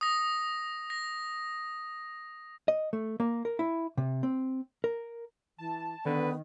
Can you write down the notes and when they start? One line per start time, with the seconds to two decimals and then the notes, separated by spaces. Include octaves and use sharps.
0.01 D#6 A#6
0.90 A#6
2.68 D#5
2.93 A3
3.20 A#3
3.45 A#4
3.59 E4
3.97 C3
4.23 C4
4.84 A#4
5.58 E3 A5
6.06 D3 D#3 B3 B4